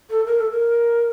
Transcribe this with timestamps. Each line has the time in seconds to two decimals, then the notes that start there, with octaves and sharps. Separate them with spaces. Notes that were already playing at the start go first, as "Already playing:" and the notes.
0.10 A4
0.26 A#4
0.39 A4
0.50 A#4